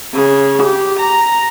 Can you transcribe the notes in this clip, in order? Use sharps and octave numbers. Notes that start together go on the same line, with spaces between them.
C#3
G4
A#5